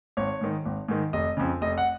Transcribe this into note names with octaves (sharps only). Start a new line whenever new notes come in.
G#1 C#5
G#2 D#3
G#1
G#2 D#3
F1 D#5
F2 C#3
F1 D#5
F#5